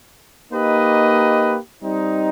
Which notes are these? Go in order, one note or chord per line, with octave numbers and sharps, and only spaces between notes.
A#3 D#4 G4 B4 D#5
G3 C4 D#4